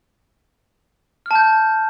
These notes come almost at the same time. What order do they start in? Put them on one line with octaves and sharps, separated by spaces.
F6 A5 G6